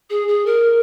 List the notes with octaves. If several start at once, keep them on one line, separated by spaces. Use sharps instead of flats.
G#4
G#4
A#4